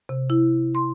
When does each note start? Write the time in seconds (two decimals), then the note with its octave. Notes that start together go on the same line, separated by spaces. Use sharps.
0.09 C3
0.30 E4
0.75 C6